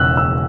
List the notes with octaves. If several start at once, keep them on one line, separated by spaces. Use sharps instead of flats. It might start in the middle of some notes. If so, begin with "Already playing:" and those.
Already playing: E1 E2 C#3 E6 F#6
E6